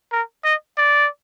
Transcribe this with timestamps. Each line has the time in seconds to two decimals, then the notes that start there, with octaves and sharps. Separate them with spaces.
0.12 A#4
0.44 D#5
0.78 D5